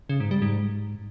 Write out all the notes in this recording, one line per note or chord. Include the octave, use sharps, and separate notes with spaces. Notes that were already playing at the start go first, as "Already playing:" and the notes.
C#3
G#2
G3
G#2